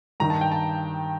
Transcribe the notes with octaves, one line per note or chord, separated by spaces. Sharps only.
G2 D#3 A#5
A5
G5
A5